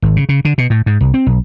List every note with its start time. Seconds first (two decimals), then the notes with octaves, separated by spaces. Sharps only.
0.02 G#1
0.16 C#3
0.29 C#3
0.45 D3
0.58 B2
0.70 A2
0.86 G#2
1.01 C2
1.14 C4
1.26 B1